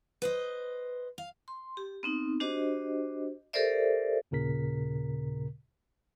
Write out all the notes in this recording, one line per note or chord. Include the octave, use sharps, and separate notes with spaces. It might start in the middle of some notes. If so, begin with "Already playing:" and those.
B4 C5 D#5
F5
C6
G4
B3 C4 D#4
D4 F#4 G4 C5 D#5
G4 A4 A#4 C5 D5 E5
D#2 A#2 C#3 A#4 B6